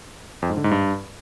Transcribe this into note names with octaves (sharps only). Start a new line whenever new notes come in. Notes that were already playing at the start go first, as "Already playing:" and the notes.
F2
G#2
D3
G#2
G2